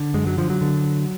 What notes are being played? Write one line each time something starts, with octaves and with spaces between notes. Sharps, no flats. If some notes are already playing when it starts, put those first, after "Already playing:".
Already playing: D3
F#2 G#3
F#3
D3 F3
F#3
D3